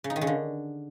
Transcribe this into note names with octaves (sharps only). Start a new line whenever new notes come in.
C#3
D#4
D#3
C#3
D3